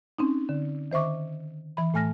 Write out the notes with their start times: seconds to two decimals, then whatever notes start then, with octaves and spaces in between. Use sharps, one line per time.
0.19 C4 C#4 D#4
0.49 D3
0.92 D#3 C5 E5 C#6 D6
1.77 E3 B5
1.94 A2 A3 G#5 F6 A#6